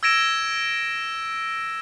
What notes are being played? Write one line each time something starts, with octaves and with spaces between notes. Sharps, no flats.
E6 G#6 A#6 D7 E7